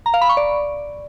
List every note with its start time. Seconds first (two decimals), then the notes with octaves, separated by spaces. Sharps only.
0.06 A#5
0.14 F5
0.21 B5
0.29 C#6
0.37 D5